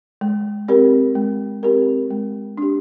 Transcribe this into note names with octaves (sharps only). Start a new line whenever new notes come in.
G#3
C4 G4 A#4
G#3
C4 G4 A#4
G#3
D4 G4